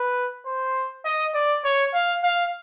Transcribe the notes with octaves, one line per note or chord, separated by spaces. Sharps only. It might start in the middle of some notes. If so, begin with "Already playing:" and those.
Already playing: B4
C5
D#5
D5
C#5
F5
F5